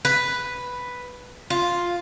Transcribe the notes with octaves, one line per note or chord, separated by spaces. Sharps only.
B4
F4